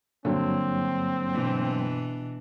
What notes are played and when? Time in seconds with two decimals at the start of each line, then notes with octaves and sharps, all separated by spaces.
0.25 G2 D3 F#3 A#3 C4
1.32 B2 E3 D4